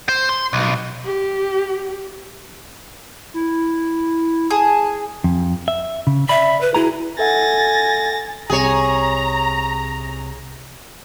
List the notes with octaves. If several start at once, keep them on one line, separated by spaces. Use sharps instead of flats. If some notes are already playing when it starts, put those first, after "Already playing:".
C5
C6
B1
G4
E4
G#4 A5
F2
E5
C#3
D5 E5 B5
B4
E4 F#4 G#4 A#5
A4 E5 F#5 G#5 A6 A#6
C2 C3 G#4 C#5 A#5